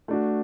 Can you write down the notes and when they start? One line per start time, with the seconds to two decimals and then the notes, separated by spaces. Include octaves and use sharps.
0.08 A3 D4 F#4